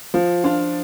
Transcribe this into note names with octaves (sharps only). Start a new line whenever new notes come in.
F3
D4 F4